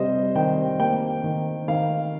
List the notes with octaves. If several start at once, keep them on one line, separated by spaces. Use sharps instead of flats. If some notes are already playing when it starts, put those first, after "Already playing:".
Already playing: C3 G3 C5 D#5
D#3 G5
A#3 G5
D#3
D#3 F5